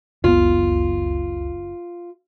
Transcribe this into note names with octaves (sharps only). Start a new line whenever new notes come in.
F#1 C#2 B3 F4